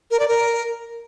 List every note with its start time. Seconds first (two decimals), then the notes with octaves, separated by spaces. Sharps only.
0.11 A#4
0.20 D5
0.28 A#4